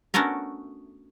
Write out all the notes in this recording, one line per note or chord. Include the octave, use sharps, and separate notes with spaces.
A3 B3 C#4 D4 F#4 A#4